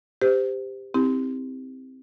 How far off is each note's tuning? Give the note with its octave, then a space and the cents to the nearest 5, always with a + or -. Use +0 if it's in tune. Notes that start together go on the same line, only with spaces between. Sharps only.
G4 +15 C5 -25
C4 +0 E4 -35 G4 +20